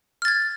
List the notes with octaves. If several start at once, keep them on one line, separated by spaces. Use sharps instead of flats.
F6 G#6 A6